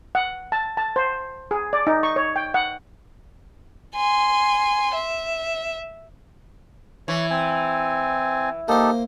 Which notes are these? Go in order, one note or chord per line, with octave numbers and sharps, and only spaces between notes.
F#5
A5
A5
C5
G#4
D5
D#4
C#6
C#5
G5
F#5
G#5 C6
E5
E3 C#5
C4 G#5
A#3 D#4 G4 A4 C5